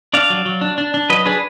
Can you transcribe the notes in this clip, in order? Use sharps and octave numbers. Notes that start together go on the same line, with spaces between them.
D4 D5 F5
F#3
F#3
D4
D4
D4
F#3 B4 D#5
D4 G#4 B4